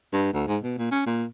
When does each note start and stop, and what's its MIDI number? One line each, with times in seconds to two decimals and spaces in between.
0.13 0.32 43
0.33 0.44 38
0.47 0.58 44
0.63 0.74 47
0.78 0.90 46
0.91 1.06 61
1.06 1.24 46